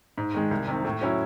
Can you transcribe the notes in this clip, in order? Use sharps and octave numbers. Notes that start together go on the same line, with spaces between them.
G#2
D#3 G#3
C2
C3 D#3
A2
F#3 C#4 E4